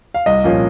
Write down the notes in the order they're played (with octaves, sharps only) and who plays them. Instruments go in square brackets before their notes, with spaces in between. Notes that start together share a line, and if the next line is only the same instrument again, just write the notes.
[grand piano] F5
C2 D#5
A#2 F3 A#3 C#4